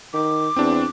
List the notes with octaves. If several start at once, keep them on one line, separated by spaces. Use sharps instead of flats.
D#3 D6
E2 C4 D4